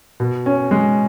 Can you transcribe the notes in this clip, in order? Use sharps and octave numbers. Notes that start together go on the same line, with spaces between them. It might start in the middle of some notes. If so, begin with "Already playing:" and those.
B2
C#4
G#3